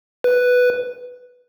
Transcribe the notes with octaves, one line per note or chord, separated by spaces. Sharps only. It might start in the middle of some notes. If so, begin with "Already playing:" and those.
B4